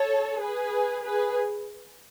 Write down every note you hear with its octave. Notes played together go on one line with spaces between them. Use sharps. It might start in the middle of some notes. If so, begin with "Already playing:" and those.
Already playing: A4 C#5
G#4 B4
G#4 B4